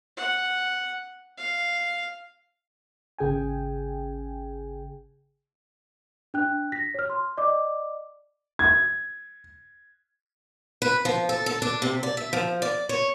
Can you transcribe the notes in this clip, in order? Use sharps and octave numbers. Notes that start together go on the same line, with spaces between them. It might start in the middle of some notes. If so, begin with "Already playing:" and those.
F#5
F5
G#1 C#3 G#4 G5 G#5
D4 G5 F#6
A#6 B6
C#5 F6
C6
D5 D#5 D6
G#6
B4
F3
A4
A4
D4
C3
D5
E5
F3
D5
C#5